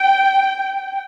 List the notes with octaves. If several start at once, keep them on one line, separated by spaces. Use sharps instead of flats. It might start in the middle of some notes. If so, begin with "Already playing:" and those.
Already playing: G5